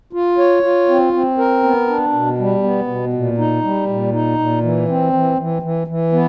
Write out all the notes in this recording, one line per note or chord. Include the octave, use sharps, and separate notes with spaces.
F4
C#5
F4
C4
C4
A#4
B3
D4
B2
G3
B3
B2
A#2
D#4
G3
A#2
D#4
A#2
E3
C4
E3
E3
E3
E3
B3